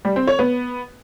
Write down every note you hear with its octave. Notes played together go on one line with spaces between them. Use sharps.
G3
C4
C#5
B3